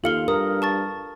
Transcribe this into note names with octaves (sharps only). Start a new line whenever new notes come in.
D#2 F4 A4 F5 C#7 G7
G2 A#4 D#6
A5 C#6 A6